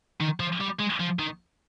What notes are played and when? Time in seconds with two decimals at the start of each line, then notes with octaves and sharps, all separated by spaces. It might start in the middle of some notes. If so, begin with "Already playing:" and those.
0.21 D#3
0.40 F3
0.61 G3
0.79 G#3
1.00 F3
1.19 D#3